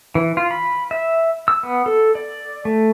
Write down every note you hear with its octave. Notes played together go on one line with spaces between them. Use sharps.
E3
F4
B5
E5
E6
B3
A4
D5
A3